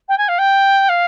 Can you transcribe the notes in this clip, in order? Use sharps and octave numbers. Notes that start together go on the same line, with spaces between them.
G5
G#5
F5
G5
F5